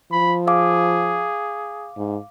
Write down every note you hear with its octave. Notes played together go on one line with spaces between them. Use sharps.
F3 B5
G#4 F5 D6
G#2